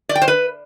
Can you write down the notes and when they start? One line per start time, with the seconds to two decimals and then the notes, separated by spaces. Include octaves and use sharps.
0.09 D5
0.15 G5
0.22 C5
0.28 B4